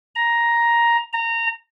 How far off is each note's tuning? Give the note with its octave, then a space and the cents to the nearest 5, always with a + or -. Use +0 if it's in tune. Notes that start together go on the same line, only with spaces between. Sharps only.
A#5 +10
A#5 -20